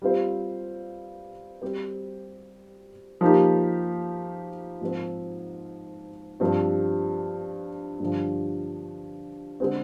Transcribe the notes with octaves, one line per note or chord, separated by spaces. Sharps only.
G3 C4 F4 C5
G3 C4 G4 C5
F3 A#3 D#4 G4
G#2 F3 C4
G2 F3 C4
G2 D3 F3
D3 G#3 C4